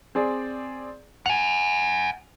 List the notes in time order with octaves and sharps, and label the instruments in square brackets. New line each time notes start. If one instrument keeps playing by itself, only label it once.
[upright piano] C4 G#4 D5
[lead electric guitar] F#5 G#5 [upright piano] F7